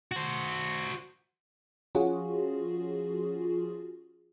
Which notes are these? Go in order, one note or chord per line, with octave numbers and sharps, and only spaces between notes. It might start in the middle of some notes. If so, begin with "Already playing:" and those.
F#4 C5
F3 C#4 F4 F#4 G#4